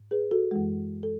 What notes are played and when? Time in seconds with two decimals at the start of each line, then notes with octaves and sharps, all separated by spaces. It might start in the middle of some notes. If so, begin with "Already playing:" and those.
Already playing: G#2
0.11 G#4 B4
0.31 F#4 A4
0.51 F#2 E3 G#3
1.03 A4